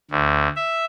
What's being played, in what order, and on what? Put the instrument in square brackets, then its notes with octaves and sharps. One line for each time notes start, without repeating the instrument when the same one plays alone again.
[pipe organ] D2
E5